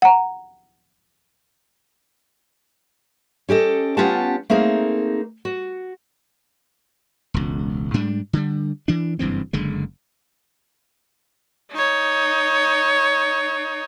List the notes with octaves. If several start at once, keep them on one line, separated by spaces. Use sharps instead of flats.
F#5 A#5
C#4 G4 A4 D#5
B3 C#4 F4 G4 F#5 A5
A3 A#3 C4 D#4 G#4 A#4
F#4
E1 C#2
G#2 G3 D4
D3 G3
E3 D4
F#1 G2 E3 C4
F#1 D3 G#3
D#4 C#5